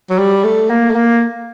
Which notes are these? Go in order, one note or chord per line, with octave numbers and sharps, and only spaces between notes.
F#3
G3
A3
A#3
A3
A#3